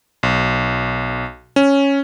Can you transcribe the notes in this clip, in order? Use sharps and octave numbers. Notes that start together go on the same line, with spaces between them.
B1
C#4